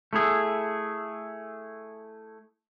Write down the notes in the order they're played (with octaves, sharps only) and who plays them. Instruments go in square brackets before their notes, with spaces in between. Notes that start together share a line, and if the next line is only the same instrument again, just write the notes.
[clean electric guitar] A3 E4 G#4